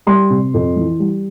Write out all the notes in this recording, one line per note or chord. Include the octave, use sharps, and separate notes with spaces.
G3 C6
C3
F2
E3
G3